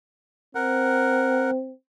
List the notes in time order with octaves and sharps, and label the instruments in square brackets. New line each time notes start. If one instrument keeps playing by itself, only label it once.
[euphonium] C4 [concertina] A#4 F#5